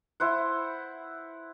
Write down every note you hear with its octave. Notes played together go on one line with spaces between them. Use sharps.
E4 C5 F#5